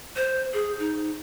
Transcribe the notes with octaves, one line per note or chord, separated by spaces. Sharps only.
C5
G#4
D#4